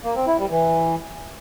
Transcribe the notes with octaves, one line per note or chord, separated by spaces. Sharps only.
A#3
C4
E4
G3
E3